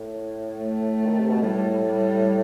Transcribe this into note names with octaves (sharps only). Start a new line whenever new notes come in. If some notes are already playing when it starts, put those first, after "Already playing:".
Already playing: A2
A3
D#3
C3
B2
A2 G3
G3